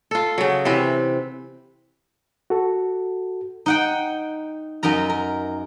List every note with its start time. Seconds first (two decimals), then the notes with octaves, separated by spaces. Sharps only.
0.11 F4 A4
0.38 C#3 F#3
0.65 C3 E3 C4 B4
2.50 F#4 A4
3.66 D#4 F#5 G5
4.83 F#2 D#4 A#4 A#5
5.09 A#4